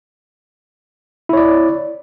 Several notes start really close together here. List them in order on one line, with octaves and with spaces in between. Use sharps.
E4 C#5 D5